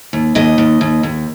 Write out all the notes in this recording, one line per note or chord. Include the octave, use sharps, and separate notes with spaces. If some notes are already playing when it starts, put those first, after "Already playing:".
D#2
D#2 D#5
D#2
D#2
D#2